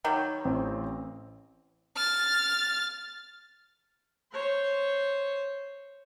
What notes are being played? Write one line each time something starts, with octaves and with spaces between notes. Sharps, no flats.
D#3 F#3 G3
A1 C4
F6 A6
C5 C#5